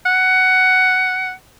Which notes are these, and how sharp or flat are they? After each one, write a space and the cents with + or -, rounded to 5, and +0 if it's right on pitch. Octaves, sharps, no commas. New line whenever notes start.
F#5 +10